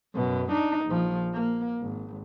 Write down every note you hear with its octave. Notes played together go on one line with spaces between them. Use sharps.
F#2 B2
D4 D#4
A#1 F3
A#3
G#1